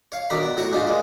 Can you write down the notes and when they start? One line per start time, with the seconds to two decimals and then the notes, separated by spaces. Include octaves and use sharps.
0.12 C#5 F5
0.30 B1 D#3 D4 A#4 A#5 B5
0.43 B3
0.57 A2 F#4 C#5 F#5 A#5 C#6
0.72 G#2 D4 D#4 F4 F#4
0.87 G#3 A#3